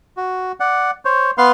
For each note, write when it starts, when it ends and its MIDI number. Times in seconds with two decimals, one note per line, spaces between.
0.17 0.52 66
0.60 0.91 74
0.60 0.91 78
1.05 1.31 72
1.05 1.31 73
1.38 1.52 59
1.38 1.52 71
1.38 1.52 77
1.38 1.52 84
1.38 1.52 89